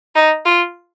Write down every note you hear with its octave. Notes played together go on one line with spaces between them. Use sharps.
D#4
F4